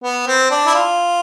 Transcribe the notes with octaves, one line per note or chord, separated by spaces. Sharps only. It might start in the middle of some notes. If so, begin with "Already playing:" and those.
B3
C4
D4
E4
F4